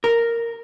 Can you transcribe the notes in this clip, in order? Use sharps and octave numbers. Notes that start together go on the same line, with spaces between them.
A#4